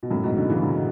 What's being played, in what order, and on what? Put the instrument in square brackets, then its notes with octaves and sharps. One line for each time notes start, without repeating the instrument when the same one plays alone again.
[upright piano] B2
F#2 A2
G#2 B2
B2 D3
C#3 E3
G#3
D3 F#3